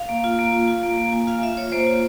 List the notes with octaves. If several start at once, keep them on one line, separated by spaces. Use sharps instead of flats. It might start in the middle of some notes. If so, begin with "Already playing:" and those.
Already playing: F5
A#3
F4
A#3
F4
F4
A#3
A#3
A#3 G#5
F4 F5
F4 E5
F4 C#5
A#3 C5
F4